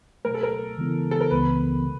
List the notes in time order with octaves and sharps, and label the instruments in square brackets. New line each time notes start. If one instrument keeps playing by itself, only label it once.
[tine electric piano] B2 F#3 A3 [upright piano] A#4
[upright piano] A4
A#4
[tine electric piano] C#3 E3 G#3 B3 E4
[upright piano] A4
A#4
[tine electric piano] C#2 C#3 E3 G#3 B3 [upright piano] B4
[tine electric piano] C3